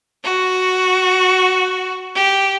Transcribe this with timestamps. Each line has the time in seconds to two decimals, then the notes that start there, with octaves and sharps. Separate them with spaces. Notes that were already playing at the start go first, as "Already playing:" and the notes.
0.24 F#4
2.15 G4